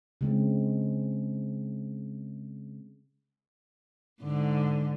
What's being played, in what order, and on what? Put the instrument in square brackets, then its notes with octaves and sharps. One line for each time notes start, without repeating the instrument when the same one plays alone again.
[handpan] C#3 G#3 C4
[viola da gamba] G#2 D3